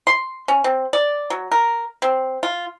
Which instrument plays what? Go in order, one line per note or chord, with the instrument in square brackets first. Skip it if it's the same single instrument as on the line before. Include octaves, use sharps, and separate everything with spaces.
[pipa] C6
C#4
C4
D5
F#3
A#4
C4
F4